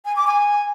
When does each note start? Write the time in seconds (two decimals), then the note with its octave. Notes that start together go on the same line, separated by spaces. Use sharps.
0.05 G#5
0.16 D6
0.27 G#5